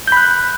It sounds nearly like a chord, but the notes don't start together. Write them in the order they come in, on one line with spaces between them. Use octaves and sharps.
G6 B5 F#6